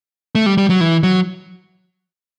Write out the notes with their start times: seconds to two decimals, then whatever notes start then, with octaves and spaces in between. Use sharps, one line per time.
0.35 A3
0.46 G3
0.58 G3
0.70 F#3
0.81 E3
1.03 F#3